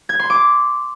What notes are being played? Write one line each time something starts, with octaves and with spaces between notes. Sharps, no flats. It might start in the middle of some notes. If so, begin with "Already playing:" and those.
G#6
C6
D6